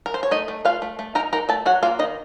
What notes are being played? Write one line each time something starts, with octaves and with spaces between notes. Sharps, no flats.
A#4
C5
C#5
A3 D#4 D#5
A3
A3 F4 F5
A3
A3
D#4 A#4 A#5
D#4 A#4 A#5
A3 A4 A5
F#3 F#4 F#5
A#3 F4 F5
D#3 D#4 D#5